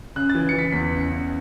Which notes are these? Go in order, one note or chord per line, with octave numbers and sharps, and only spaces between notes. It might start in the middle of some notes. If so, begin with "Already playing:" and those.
C#3 F#6
A6
E3
E3 C#7
B6
E2 B6
C#3
C#7
C#3